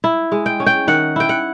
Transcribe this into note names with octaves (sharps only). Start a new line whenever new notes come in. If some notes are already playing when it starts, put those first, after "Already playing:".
E4
G#3
G5
C#4
G5
D#3 F#5
E4 G5
F#5